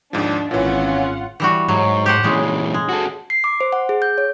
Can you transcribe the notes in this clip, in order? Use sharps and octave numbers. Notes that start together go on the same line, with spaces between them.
D#2 G#2 F3 D4
G#1 A#2 E3 C#4 F4 F#5
E3 G3 F#4
G#2 F#3
G4 C5 F#5
A#2 C#3 E3 G#3
G#3
F#4 A4
C7
D6
C5
F#5
G#4
G6
C#5